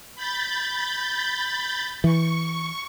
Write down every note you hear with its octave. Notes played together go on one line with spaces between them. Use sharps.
B5 G6 A6
E3 C#6